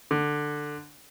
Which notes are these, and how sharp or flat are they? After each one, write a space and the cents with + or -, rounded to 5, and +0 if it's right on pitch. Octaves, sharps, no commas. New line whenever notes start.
D3 +10